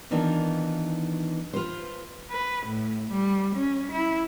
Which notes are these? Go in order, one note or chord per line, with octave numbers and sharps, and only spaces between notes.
D#3 E3 B3 D4 D#4 F4
F4 B4 C5
B4
A2
G3
C#4
E4